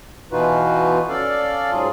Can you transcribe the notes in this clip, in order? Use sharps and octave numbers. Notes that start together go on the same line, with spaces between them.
B2 E3 D#4 F4 F#4 B4
C#4 A4 D5 F5
G#2 F#3 F4 G#4